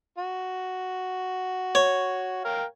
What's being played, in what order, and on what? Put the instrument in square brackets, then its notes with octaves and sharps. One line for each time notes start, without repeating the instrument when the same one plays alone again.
[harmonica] F#4
[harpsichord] C#5
[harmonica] A#4 F5 G5